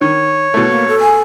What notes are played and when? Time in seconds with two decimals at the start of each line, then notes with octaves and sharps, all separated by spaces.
0.01 D#3 C#5
0.54 B2 A3 E4
0.69 A#3
0.88 A4
1.00 G#5